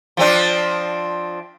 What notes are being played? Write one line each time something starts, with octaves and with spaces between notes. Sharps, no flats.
F3 C4 D4